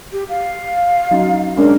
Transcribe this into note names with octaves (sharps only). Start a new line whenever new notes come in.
G4
F5
F#3 C#4 D#4
G#3 C#4 D4 A#4